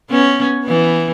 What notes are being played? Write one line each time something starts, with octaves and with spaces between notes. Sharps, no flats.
B3 C#4
E3 B3